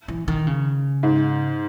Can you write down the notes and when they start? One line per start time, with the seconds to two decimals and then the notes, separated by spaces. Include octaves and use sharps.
0.08 E3
0.28 D#3
0.47 C#3
1.03 G#2